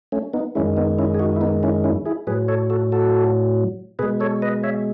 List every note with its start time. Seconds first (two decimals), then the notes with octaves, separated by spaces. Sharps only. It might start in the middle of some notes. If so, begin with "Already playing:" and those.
0.12 A3 C#4
0.34 B3 D#4
0.55 F#2 D#3 G#3 C#4 E4
0.77 B3 D#4
0.99 C#4 E4
1.14 G#4
1.19 D#4 F#4
1.36 E4
1.41 B3 D#4
1.63 C#4 E4
1.84 C#4 E4
2.06 E4 G#4
2.27 A2 F#3 G#4 B4
2.48 A4 C#5
2.70 F#4 A4
2.92 F#4 A4
3.99 B2 G#3 G#4 B4
4.20 A4 C#5
4.42 B4 D#5
4.63 C#5 E5